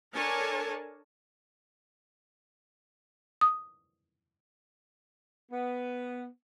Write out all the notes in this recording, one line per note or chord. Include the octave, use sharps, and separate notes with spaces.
D4 A4 A#4 C#5 G#5 A5
D#6
B3